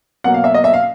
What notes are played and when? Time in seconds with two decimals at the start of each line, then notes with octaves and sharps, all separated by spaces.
0.24 B2 F#3 A#3 F#5
0.34 F5
0.44 E5
0.54 D#5
0.64 E5
0.73 F5